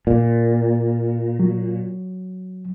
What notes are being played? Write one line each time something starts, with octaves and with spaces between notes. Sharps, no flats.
A#2
F#3